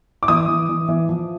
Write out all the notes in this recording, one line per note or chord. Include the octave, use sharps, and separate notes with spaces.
D6
E3 D#6
E3
E3
E3
F3